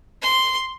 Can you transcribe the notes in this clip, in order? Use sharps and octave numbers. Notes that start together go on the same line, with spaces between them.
C6